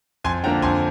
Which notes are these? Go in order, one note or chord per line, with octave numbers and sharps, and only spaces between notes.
F2 G#5 C6
D3 F3 A#3 G5 A#5
F2 G#5 C6